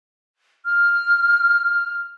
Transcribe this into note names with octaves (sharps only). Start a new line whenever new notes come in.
F6